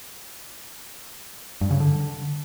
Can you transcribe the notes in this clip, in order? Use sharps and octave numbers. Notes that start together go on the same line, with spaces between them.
G2
C#3
D3